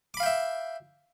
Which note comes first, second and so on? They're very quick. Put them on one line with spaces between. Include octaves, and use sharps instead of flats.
D6 B5 F5 G5 E5